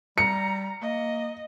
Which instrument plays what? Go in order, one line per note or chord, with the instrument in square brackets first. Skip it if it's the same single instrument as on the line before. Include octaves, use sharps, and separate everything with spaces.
[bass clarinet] G3 [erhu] A#5 [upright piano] C#7
[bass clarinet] A#3 [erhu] D#5